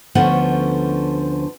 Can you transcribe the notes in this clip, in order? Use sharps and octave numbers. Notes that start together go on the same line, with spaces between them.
D2 D3 F3 B3 C#4 F#5